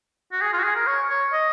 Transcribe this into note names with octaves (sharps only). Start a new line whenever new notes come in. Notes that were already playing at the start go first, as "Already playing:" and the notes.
F#4
G#4
F4
F#4
G#4
A#4
C#5
C#5
D#5